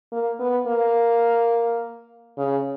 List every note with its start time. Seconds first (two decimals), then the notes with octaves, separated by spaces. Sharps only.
0.12 A#3
0.40 B3
0.67 A#3
2.37 C#3